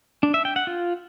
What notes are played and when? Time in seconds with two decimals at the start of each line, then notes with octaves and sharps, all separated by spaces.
0.23 D4
0.34 E5
0.45 G5
0.56 F#5
0.67 F4